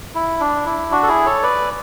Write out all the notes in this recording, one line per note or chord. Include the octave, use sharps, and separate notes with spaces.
E4
D4
E4
D4 F#4
A4
E4 G#4
A4 C#5
B4 D5